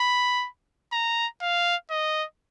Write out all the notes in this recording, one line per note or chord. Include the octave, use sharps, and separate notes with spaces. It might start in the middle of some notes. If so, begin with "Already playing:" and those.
Already playing: B5
A#5
F5
D#5